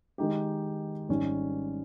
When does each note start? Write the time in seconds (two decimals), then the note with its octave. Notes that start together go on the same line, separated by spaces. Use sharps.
0.18 D#3 G#3 D#4 G4
1.09 G#1 G#2 G3 C#4